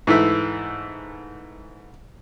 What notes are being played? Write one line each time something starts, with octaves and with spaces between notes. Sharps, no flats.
G#2 E3 A3 E4